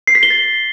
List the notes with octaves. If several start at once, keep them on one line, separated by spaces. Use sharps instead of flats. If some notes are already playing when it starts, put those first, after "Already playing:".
C7
B6
G7
A6